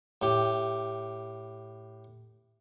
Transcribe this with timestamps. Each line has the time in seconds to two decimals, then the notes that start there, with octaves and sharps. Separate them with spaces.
0.22 A2 G4